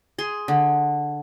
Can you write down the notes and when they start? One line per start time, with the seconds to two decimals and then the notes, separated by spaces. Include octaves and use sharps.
0.18 G#4 C6
0.48 D3